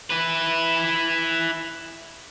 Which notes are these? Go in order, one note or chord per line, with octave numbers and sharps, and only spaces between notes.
E4 B4